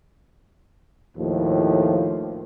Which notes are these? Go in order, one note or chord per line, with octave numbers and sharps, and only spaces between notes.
D#2 A2 F3